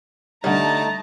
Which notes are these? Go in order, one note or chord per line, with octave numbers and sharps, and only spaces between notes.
D3 G3 A3 D#4 A5 A#5